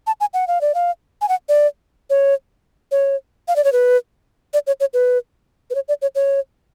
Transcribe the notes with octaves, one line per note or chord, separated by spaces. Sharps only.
A5
G#5
F#5
F5
D5
F5
G#5
F#5
D5
C#5
C#5
F5
D5
C#5
B4
D5
C#5
C#5
B4
B4
C#5
D5
C#5
C#5